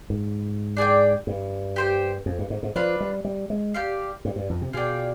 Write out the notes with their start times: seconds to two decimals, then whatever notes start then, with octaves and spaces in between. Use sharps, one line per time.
0.10 G#2
0.77 D4 G#4 D5 G5
1.27 G2
1.76 G4 C5 G5
2.26 F2
2.39 G2
2.50 G#2
2.63 G#2
2.76 F3 D4 F4 B4
3.00 G3
3.25 G3
3.50 G#3
3.74 G4 D5 F5
4.25 G2
4.36 G2
4.50 F2
4.62 C3
4.73 B2 F4 G#4 D5 G5